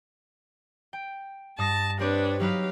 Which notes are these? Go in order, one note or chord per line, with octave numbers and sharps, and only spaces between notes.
G5
G2 A5 D#6 A#6
C4 D4 G4 B4 C#5
F#3 D#4 G4 B4 F5